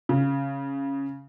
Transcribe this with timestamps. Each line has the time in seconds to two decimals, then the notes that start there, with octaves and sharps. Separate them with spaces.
0.09 C#3